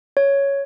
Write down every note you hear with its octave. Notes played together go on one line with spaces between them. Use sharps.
C#5